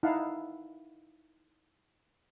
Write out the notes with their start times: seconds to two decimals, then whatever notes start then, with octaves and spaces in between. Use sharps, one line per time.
0.03 D#4 E4 F5 F#5 A5